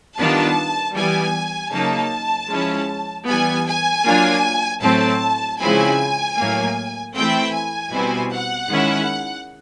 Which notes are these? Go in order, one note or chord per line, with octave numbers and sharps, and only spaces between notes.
D#3 G3 B3 D4 F4 A5
E3 G3 B3 G#5
C#3 F#3 A#3 D#4 A5
F3 G#3 C#4 E4
E3 G3 B3 G#5
G#5
F#3 A#3 D4 F4
A2 F#3 A3 C4 A5
C#3 F3 G#3 C4 E4 G#5
A2 F#3 A#3
E3 A3 C4 E4 G5
G#5
B2 G3 C4 E4
F#5
D#3 G#3 C#4 E4